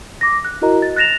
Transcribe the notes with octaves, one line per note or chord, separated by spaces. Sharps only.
D6 A#6
F#6
E4 F#4 A#4 D#5 A#5
A6
F#6 A6 A#6 E7 F7